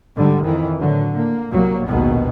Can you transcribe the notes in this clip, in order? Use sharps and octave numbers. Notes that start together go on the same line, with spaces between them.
G#2 D3 G3
F2 D#3 E3
A2 D3 F#3
A#3
C2 F#3 A#3
A#1 D#2 B2 D#3 G#3 B3